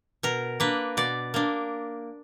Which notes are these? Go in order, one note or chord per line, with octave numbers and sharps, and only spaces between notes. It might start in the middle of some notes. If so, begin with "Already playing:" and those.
B2 A#4
A#3 D4 B4
B2 D5
A#3 D4